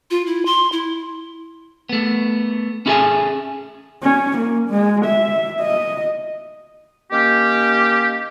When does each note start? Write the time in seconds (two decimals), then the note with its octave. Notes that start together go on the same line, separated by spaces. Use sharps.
0.11 F4
0.26 E4
0.46 C6
0.72 E4
1.89 A3 B3
2.86 C#4 E4 G#4 A4 E5 G#5
4.03 C#4
4.38 A#3
4.69 G#3
5.05 E5
5.61 D#5
7.12 D#3 A#3 C#4 G4